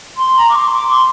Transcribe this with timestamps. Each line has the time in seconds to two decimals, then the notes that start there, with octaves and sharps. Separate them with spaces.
0.17 C6
0.36 A#5
0.48 D6
0.55 C6
0.73 D6
0.87 C6